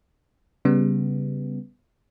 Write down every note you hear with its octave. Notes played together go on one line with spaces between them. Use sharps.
C#3 G3 B3